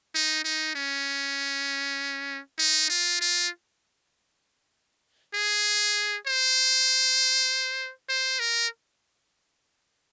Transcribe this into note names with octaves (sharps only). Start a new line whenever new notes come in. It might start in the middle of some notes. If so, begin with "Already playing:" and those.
D#4
D#4
C#4
D#4
F4
F4
G#4
C5
C5
A#4